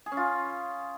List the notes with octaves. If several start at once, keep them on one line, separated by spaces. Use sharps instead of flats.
G#4
C#4
F4